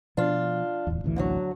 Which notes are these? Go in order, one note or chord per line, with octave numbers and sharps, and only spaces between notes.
B2 F3 D4 F4
D1 E2
A1 D2 E3
D3 F3 F#3